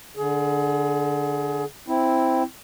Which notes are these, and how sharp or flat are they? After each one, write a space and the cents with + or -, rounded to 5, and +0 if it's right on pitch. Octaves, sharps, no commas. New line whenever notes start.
D3 +0 G#4 +25
C4 +0 E4 +0